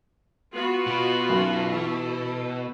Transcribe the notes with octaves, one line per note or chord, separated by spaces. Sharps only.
B3 F4 F#4
B2
B1 F#2
E3 A4